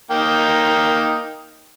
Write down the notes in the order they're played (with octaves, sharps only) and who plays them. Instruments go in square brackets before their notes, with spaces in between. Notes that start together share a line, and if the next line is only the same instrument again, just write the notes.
[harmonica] A#3 D#4 G5